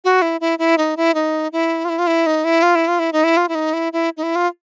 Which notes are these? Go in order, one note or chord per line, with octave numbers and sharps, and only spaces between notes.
F#4
E4
E4
E4
D#4
E4
D#4
E4
F4
E4
F4
E4
D#4
E4
F4
E4
F4
E4
D#4
E4
F4
E4
D#4
E4
E4
D#4
E4
F4